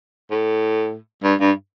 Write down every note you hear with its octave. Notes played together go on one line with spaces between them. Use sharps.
A2
G2
G2